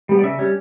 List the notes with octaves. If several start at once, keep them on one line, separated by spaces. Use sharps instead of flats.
G3 B3
D5
C#3 E5
G3 C#4